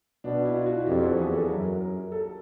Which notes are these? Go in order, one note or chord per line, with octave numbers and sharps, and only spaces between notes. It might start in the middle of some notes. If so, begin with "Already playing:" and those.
B2 D4
E4
F4
F#4
F2 G4
A4
E2 G#4
A4
F#2 A#4
A#4
A4